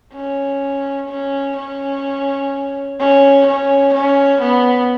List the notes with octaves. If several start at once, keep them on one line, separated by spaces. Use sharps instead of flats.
C#4
C#4
C#4
C#4
C#4
C#4
B3